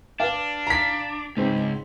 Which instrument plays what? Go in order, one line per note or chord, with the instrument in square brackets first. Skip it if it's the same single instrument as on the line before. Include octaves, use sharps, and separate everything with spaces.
[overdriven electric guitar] D4 [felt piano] B4 F5
[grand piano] A#5 B6
[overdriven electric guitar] C#2 [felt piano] G#2 C4